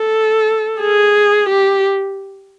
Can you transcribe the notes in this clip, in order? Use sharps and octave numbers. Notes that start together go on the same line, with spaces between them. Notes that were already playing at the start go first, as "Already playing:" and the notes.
Already playing: A4
G#4
G4